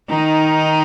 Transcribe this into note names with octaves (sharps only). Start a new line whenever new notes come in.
D#3 D#4